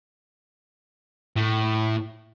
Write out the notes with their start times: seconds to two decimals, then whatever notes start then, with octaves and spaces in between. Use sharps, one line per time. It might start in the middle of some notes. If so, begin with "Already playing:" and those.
1.36 A2